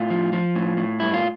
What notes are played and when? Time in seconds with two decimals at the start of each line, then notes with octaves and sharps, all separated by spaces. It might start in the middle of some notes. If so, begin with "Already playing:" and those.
Already playing: A2 F4
0.10 F3
0.33 F3
0.55 A2
0.77 A2
1.00 G2 E4
1.14 F4